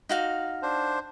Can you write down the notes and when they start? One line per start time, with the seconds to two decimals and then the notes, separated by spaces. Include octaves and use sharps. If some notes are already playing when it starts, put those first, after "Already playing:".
0.09 D#4 F#4 F5
0.63 D4 C5